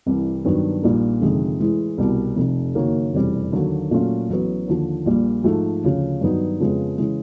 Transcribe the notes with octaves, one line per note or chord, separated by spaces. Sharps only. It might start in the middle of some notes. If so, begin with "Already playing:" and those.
C2 C3 E3 G3
G2 D#3 F#3 B3 D4
A#1 A#2 G3 A#3 D#4
G1 F2 C3 D#3 G#3
A2 E3 G#3
C2 B2 G3
F1 F2 C3
F#1 F#2 D#3 F#3 A#3
F1 E2 B2 G3 C4
D#2 D3 F#3 A#3
A#2 F#3 A3 C#4 F4
A1 A2 F#3 B3
D#2 D3 F3
A#1 A#2 G3
G#2 F3 A3
D2 C#3 F3
G2 D#3 F#3 B3 D#4
F2 C#3 F3 G#3 B3
C#3 E3 G#3